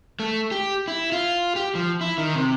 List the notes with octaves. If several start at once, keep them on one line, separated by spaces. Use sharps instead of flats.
A3
G4
E4
F4
G4
F3
E4
D#3
C3